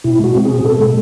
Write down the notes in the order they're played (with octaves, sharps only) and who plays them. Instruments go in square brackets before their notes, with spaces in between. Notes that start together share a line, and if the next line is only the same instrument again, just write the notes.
[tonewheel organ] B2 E4
G#3 F#4
C4
B2 G#4
B2 A4
G#3